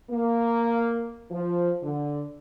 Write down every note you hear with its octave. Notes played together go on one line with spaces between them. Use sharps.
A#3
F3
D3